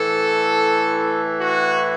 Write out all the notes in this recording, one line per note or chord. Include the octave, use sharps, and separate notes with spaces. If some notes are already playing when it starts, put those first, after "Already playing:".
Already playing: A2 E3 A4
F#4